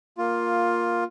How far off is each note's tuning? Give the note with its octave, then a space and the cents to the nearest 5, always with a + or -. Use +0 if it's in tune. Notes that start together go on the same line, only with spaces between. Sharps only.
A#3 +0 F4 +10